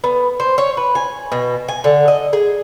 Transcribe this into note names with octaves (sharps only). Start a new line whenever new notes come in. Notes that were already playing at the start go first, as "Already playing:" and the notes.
B3
C5
C#5
B4
G#5
B2
G#5
D3
D#5
G#4